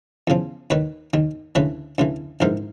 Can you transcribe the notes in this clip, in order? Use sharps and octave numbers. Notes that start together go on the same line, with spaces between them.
E2 C#3 F3
D#2 D#3 B4 C#5
D#2 D#3
D2 C#3 E3 B4 C#5
D2 C#3 E3
A#1 G#2 E3 A#4 C5